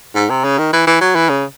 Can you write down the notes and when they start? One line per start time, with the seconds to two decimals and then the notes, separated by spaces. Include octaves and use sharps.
0.15 G#2
0.30 C3
0.44 C#3
0.58 D#3
0.73 E3
0.87 E3
1.01 F#3
1.15 E3
1.29 C#3